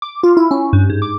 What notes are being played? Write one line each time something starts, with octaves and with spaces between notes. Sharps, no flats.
D6
F4
E4
C#4
G2
G#2
D6